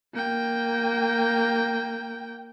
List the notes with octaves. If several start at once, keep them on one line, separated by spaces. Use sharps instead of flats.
A#3 G5